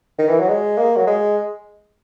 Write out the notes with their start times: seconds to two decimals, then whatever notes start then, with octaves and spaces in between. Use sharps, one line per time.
0.19 D#3
0.29 E3
0.40 F#3
0.49 G#3
0.78 A#3
0.97 F#3
1.07 G#3